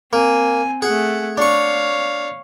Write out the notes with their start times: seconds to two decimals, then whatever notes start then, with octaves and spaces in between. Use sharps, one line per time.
0.13 A#3 C4 G#5
0.82 A3 G#4 F#5
1.38 D4 C#5 F5 C#6